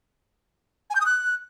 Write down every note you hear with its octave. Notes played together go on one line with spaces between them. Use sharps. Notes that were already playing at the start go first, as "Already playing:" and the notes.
G#5
G6
D#6
F#6